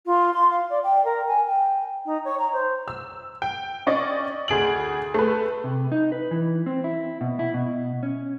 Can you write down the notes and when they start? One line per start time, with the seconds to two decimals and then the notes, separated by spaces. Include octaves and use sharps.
0.06 F4
0.33 C6
0.49 F5
0.69 D5
0.83 G5
1.05 A#4
1.27 G#5
1.47 G5
2.05 D#4
2.24 C#5
2.39 A#5
2.52 C5
2.88 E6
3.42 G5
3.87 C#4 D5 D#5 C#6
4.48 D2 G#4 D7 F#7
5.14 A3 B4
5.64 C3
5.92 D#4
6.12 B4
6.31 E3
6.66 C4
6.84 E4
7.21 B2
7.39 E4
7.54 B2
8.03 C#4